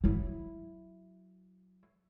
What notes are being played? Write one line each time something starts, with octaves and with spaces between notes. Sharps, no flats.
F#3 E4